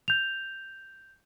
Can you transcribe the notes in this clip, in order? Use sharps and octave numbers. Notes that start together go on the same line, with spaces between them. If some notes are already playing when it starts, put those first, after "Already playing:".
G6 F7